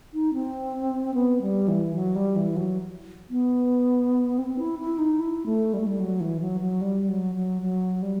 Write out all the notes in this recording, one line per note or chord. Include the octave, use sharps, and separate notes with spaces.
D#4
C4
B3
G3
E3
F#3
G3
E3
F#3
B3
C4
E4
E4
D#4
E4
A3
G3
A3
G3
F#3
E3
F#3
F#3
G3
F#3
F#3
F#3
G3